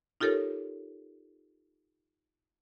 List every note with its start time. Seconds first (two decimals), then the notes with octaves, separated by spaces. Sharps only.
0.20 D#4 F4 G4 A4 A#4 C#5